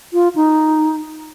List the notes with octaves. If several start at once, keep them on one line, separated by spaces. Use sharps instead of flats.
F4
D#4